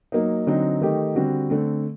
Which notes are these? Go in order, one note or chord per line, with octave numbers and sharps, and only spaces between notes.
F#3 A#3 D#4
D3 F#3 C4 D#4
D#3 A3 D#4 G4
D3 G3 C4 F#4
D3 A3 C4